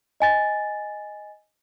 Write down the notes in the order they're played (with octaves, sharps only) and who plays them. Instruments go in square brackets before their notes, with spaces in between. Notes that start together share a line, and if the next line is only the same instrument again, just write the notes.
[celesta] D#5 G#5 A6